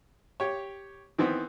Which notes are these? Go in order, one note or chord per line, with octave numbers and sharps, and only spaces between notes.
G4 C#5
D#3 E3 B3 C4